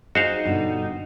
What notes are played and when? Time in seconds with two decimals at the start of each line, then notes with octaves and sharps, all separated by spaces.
0.15 D4 D#4 F#4 G#4 C5 F5
0.45 G2 B2 D3